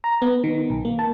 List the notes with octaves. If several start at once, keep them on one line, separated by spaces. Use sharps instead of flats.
A#5
B3
D#3
B1
A#3
A5